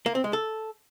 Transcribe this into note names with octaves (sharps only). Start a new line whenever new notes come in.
A#3
C4
G#3
A4